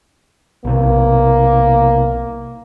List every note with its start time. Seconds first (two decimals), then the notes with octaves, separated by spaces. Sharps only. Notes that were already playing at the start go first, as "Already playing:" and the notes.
0.65 B1 C3 A#3